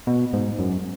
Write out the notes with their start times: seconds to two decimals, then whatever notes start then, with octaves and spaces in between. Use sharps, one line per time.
0.07 B2
0.33 G#2
0.59 F#2